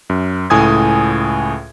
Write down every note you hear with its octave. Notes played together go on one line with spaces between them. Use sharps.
F#2
C#2 A2 G#5 D#6 G#6